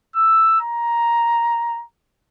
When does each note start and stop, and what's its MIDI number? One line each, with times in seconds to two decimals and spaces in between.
0.16 0.57 88
0.61 1.83 82